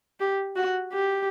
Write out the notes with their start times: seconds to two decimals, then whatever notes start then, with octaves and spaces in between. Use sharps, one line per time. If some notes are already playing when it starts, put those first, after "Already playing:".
0.20 G4
0.56 F#4
0.93 G4